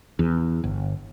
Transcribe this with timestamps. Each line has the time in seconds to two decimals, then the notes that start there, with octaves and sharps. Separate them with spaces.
0.19 E2
0.64 G1